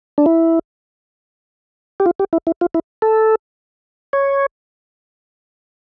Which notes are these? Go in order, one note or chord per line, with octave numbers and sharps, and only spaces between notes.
D4
E4
G4
F4
G4
E4
E4
F4
E4
A4
C#5